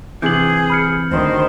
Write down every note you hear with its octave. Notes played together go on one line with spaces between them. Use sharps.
C3 E3 G#4 G6 F#7
B5 F6 C#7
D2 D#3 C5